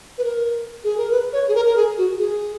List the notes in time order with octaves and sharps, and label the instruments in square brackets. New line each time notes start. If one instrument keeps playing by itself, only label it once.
[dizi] B4
A#4
G#4
A#4
B4
C#5
G#4
A#4
A#4
G#4
F#4
G#4